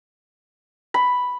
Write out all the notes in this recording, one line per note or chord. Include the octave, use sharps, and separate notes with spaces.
B5